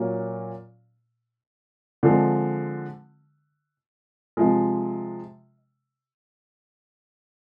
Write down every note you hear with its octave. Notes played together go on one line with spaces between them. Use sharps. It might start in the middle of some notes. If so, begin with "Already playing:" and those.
Already playing: A#2 F#3 A#3 C#4
D3 F3 G#3 C4
C3 F3 G#3